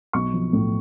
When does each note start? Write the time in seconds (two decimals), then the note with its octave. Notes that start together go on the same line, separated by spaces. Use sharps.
0.13 B1 C#6
0.33 F3
0.53 A2